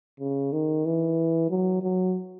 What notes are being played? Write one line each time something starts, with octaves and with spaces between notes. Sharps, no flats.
C#3
D#3
E3
F#3
F#3